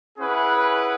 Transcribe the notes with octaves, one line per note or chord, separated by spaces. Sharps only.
C#4 E4 G#4 B4 F#5